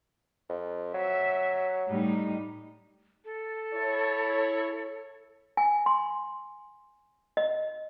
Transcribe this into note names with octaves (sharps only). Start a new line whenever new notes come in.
F2
F#3 E5
A2 G3 D#4
A4
E4 C#5
G#5
C6
D#5